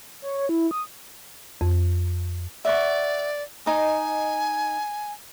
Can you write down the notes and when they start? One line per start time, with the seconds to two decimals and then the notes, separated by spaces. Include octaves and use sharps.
0.22 C#5
0.37 C#5
0.49 E4
0.71 D#6
1.61 F2
2.65 D5 E5 F#5 C#6
3.66 D#4 D#5 G#5